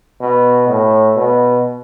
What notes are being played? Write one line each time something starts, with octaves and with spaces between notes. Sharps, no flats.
B2
A2
B2